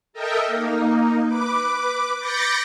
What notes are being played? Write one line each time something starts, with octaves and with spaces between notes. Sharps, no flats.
A4 A#4 D#5 E5 G5
A#3 D#4
B4 D6
B5 D6 G6 A6 A#6 C#7